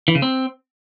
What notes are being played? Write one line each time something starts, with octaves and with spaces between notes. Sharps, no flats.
E3
C#3
C4